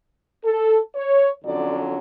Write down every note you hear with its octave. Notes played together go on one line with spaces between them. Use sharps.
A4
C#5
F2 D3 F#3 C#4 D5